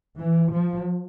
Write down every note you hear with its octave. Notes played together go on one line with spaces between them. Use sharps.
E3
F3